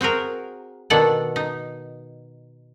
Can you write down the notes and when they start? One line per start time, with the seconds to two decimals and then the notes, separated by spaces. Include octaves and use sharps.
0.01 C4 F#4 G#4 A#4
0.90 B2 D#3 D4 A4 D5 F#5
1.36 D#4